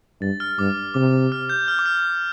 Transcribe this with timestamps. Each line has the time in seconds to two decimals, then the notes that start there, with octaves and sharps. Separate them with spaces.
0.21 G2 A6
0.40 F6
0.58 G2 D6
0.94 C3 D6
1.32 F6
1.49 G6
1.68 F6
1.79 D6
1.86 F6